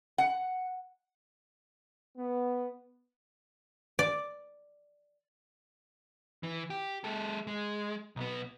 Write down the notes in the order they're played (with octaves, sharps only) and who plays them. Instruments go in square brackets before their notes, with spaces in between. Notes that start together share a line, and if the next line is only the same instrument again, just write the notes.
[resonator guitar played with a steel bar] F#5
[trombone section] B3
[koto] D5
[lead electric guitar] E3
G4
G#3 A4
G#3
B1 B3